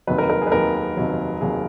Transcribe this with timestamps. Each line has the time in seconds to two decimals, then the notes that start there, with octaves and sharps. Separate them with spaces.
0.07 F1 D#2 D#3 F#3 B4
0.18 A#4
0.30 A#4
0.42 G#4
0.47 B4
0.52 F1 D#2 D#3 F#3 A#4
0.97 F1 D#2 D#3 F#3
1.41 F1 D#2 D#3 F#3 G#4